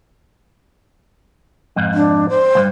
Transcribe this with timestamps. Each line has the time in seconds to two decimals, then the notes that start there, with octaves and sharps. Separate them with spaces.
1.76 F2 G#2
1.94 D4
2.29 C5
2.55 C#2 G2